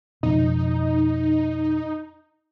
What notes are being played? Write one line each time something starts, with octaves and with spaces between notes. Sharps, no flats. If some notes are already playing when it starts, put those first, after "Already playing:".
F2 B2 D#4